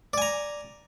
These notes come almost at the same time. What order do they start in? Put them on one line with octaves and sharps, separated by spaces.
D5 G#5 A#5